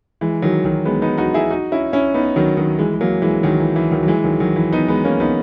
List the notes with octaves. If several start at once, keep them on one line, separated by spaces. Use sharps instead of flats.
E3 G#3
D#3 F#3
D#3 F#3
G#3 B3
B3 D#4
D#4 F#4
E4 G#4
D#4 F#4
C#4 E4
C#4 E4
B3 D#4
D#3 F#3
D#3 F#3
E3 G#3
G#3
F#3 A#3
E3 G#3
D#3 F#3
E3
E3
D#3 F#3
F#3
E3 G#3
D#3 F#3
D#3 F#3
E3
B3 D#4
G#3 B3
A#3 C#4
B3 D#4